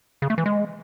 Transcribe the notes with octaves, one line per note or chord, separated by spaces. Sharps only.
C#3
A3
E3
G#3